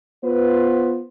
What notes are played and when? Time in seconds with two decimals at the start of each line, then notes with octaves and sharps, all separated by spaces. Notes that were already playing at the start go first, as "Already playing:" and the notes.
0.24 B3 F4 B4 C5